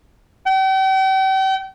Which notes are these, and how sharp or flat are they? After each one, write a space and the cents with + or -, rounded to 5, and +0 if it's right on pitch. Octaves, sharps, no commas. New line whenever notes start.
G5 -40